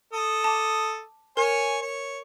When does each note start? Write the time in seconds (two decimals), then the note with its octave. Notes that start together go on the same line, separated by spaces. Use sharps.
0.13 A4 D#6
0.44 A5 D6
1.37 A#4 C#5 G#5
1.81 C#5